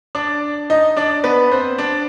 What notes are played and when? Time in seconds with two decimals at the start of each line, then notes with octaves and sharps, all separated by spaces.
0.15 D4 D5
0.70 D#4 D#5
0.97 D4 D5
1.24 B3 B4
1.51 C4 C5
1.78 D4 D5